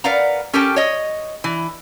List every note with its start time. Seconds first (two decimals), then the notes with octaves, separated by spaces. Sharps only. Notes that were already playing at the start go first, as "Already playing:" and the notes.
0.04 A#4 B4 D5 F5 F#5 A#5
0.53 C#4 G4 A4 A#4 G5 A5
0.76 C#5 D#5
1.44 E3